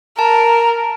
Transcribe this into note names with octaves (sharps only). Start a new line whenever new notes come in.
A#4 A5